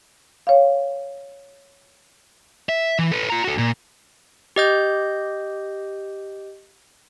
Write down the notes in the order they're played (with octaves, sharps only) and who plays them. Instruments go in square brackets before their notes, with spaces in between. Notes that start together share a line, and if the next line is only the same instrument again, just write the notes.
[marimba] C#5 F5
[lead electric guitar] E5
E3
A4 B4
F4 A#5
F#4 A4
A#2
[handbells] G4 D#5 G6